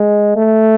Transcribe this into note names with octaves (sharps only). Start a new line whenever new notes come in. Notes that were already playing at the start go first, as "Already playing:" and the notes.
Already playing: G#3
A3